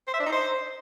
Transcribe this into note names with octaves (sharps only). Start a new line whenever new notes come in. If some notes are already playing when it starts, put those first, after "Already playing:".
C5
E5
D4
D#4
C5